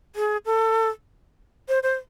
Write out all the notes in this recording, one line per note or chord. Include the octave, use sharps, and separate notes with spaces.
G#4
A4
C5
C5